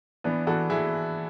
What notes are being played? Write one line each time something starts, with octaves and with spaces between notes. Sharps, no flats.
E3 B3 D4
E3 F#4 A4
E3 E4 G#4